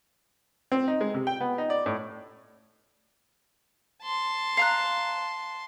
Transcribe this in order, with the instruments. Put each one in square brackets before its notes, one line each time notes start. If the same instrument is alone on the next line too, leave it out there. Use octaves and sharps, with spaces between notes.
[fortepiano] C4
D#4
G#3
C3
G5
B3
D#4
D5
A2
[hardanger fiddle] A5 C6
[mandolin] F5 A#5 F#6